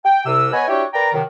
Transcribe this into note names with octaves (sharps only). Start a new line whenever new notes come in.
G5
C2 C3 E6
B3 B4 C#5 D#5 G#5
D4 E4 F#4 G4 C#5 G5
A#4 B4 D5 G5 A#5
F#2 C3 D#3